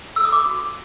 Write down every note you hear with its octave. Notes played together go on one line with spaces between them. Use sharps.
A4 E6
D#6
D6
F#4